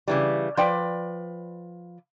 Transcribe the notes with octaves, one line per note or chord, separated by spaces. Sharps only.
C#3 E3 G3
F3 B4 D5 G5